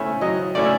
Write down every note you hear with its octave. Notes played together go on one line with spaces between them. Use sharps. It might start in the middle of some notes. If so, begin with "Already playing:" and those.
Already playing: A3 C#4 E4
F#3 D#5
A3 C#4 E4 D5